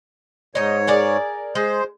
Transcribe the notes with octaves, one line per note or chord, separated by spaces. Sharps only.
G#2 D#4 C#5 D#5
G#4 A#4 D5
G#3 C5